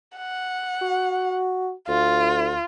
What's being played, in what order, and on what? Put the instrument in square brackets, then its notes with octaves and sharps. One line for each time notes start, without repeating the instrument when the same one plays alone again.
[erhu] F#5
[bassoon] F#4
[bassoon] D2 [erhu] F4